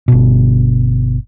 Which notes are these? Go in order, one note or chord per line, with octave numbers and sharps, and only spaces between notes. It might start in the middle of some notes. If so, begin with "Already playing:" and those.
G1 B2